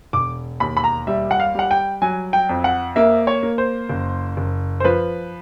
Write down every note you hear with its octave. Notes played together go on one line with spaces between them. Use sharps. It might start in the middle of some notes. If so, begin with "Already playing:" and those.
E1 D6
D#2 B5
B5
A#5
G3 E5
F#5
F5
G3 F#5
G5
F#3 G#5
G5
F2
F#5
A#3 E5
C#5
A#3
C5
F#1
F#1
C5
F3 B4